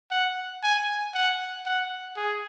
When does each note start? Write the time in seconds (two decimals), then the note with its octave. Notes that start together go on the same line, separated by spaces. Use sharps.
0.11 F#5
0.63 G#5
1.14 F#5
1.66 F#5
2.17 G#4